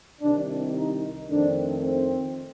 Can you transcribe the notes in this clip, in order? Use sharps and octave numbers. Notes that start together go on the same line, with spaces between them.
C2 C3 D#3 D4
D#4
F2 D#3 A3 C4 D4
C4